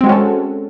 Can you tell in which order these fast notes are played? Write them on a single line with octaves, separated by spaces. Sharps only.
C4 G#3 F#4 C#4 A4